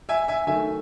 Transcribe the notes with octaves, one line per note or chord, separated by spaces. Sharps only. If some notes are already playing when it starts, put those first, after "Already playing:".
E5 G#5
E5 G#5
D#3 F#3 A3 E5 G#5